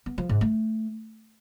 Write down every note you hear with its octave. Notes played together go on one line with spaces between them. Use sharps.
B3
F3
G#2
A3